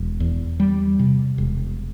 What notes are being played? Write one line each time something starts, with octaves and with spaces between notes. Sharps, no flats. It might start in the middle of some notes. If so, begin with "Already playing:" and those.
Already playing: E1
E2
G3
C3
E1